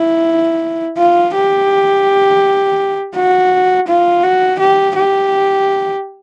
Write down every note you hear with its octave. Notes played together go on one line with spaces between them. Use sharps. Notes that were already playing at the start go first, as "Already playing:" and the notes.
Already playing: E4
F4
G4
F#4
F4
F#4
G4
G4